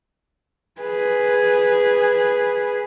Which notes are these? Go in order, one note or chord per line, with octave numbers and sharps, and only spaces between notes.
G#4 B4